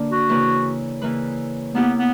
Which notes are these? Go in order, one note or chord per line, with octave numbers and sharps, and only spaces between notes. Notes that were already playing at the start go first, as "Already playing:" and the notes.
Already playing: D3 A#3 D4
F#4
C#3 E3 A#3 E4 B4
C#3 E3 A#3 E4 B4
A#3 B3 E4 G4
B3